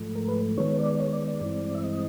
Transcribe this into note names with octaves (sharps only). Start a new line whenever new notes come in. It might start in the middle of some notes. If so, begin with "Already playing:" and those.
Already playing: G#2 F3 A3
A#4
B4
D#3 G#3 B3 C#5
D5
D5
C#5
D5
D5
G2 E3 G#3 C4
E5
D#5